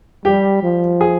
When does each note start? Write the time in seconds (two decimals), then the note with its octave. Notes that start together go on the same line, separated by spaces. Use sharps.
0.25 G3 G4
0.63 F3
1.01 G#4